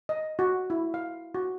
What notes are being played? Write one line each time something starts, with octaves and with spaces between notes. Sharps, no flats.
D#5
F#4
E4
F5
F#4